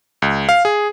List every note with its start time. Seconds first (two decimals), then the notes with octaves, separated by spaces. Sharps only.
0.22 C#2
0.49 F5
0.65 G#4